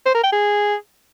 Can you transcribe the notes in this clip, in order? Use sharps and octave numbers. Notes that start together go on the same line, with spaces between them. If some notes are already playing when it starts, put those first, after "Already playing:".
C5
A#4
G5
G#4